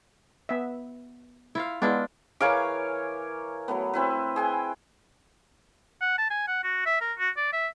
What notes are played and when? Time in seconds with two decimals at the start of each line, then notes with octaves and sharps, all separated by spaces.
0.49 B3 E5
1.55 E4 F4 F5
1.82 G#3 B3 D4 E4 F4
2.40 E3 G#4 A#4 C#5 F5 D6
3.68 F#3 A3 B3
3.94 C4 E4 B4
4.36 G#4 G5 G#5
6.01 F#5
6.18 A5
6.30 G#5
6.48 F#5
6.64 F#4
6.86 E5
7.01 A#4
7.18 F#4
7.37 D5
7.53 E5